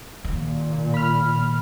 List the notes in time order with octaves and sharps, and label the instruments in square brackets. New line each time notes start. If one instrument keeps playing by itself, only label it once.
[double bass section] A#2 [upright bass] D#3
[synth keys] B5 F6